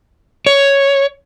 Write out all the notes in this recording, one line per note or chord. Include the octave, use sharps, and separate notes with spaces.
C#5